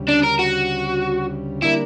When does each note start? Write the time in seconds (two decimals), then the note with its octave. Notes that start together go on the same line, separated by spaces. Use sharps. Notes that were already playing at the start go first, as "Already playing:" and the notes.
Already playing: D2 C#3 G3
0.09 D4
0.24 A#4
0.39 F#4
1.63 D3 G3 A#3 D4 E4 A#4